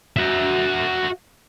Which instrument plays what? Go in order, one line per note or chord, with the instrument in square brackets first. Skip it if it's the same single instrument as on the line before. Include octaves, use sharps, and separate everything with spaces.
[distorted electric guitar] F#4 E5